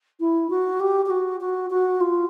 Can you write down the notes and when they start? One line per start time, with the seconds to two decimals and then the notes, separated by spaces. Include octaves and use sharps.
0.19 E4
0.49 F#4
0.79 G4
1.05 G4
1.10 F#4
1.40 F#4
1.70 F#4
2.00 F4